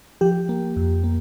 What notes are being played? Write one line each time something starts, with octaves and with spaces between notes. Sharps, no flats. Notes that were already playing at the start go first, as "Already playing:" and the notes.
F3 G4
A#3
F2
A#3